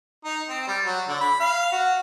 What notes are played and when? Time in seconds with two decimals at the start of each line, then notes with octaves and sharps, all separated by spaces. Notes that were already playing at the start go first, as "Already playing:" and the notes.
0.25 D#4
0.49 C4
0.67 G3
0.85 F#3
1.09 D3
1.21 B5
1.40 F5
1.72 F#4